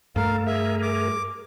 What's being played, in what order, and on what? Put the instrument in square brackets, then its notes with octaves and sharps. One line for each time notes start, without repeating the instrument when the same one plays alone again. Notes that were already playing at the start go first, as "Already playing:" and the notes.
[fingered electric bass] G2 A3 [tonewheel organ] A4 [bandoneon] A#4 F5
[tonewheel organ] G#4 A#4 [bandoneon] E5
[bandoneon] D6